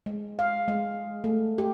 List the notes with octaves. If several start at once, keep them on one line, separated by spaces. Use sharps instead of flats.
G#3
F5
G#3
A3
G4